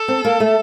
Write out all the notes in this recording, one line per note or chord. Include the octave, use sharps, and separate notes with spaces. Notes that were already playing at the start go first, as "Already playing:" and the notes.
Already playing: A4
C4
A#3
A3